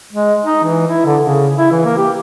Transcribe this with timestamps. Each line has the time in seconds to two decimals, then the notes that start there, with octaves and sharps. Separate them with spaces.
0.13 G#3
0.44 D#4
0.64 E3
0.87 E4
1.06 D3
1.22 C#3
1.57 E4
1.72 E3
1.85 A#3
1.97 G4